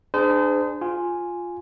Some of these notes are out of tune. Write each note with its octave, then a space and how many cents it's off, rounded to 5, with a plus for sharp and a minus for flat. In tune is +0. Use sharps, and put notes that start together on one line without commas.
D4 +25 G#4 +0 C5 -35
F4 +5 G#5 +0